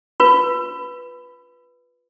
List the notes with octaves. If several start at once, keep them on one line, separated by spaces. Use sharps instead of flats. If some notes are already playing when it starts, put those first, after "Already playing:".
F4 B4